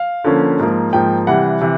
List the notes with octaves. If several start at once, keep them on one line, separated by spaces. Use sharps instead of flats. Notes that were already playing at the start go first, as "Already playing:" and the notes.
Already playing: F5
D3 F3 A#3 C#4
G#2 F3 A#3
G#2 F3 A#3 G5
C3 E3 G3 F#5
C3 E3